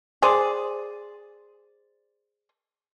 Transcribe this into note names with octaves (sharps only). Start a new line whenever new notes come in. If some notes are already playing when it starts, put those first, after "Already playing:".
G#4 C5 D5